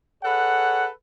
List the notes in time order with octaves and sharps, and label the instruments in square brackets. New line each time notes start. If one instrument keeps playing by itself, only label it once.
[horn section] G#4 A4 B4 C#5 F#5